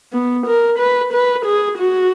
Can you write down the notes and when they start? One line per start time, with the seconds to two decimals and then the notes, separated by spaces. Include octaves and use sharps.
0.13 B3
0.47 A#4
0.79 B4
1.13 B4
1.46 G#4
1.78 F#4